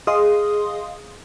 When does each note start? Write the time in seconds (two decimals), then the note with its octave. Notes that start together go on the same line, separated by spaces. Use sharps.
0.07 G#4 D#5 F5 C6 D#6